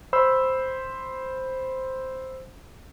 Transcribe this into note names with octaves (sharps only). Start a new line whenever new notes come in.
C5 B5 E6